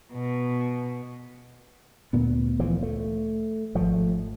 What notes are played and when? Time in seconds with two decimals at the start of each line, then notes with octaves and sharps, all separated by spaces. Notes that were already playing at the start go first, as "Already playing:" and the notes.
0.13 B2
2.13 D2 A#2 B3
2.59 E3 F3
2.83 A3
3.75 G#1 F3 A3